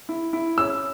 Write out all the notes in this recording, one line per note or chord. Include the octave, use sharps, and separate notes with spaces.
E4
E4
C#4 E6